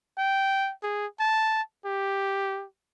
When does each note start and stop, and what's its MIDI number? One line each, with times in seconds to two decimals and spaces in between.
0.18 0.72 79
0.83 1.07 68
1.20 1.62 81
1.85 2.65 67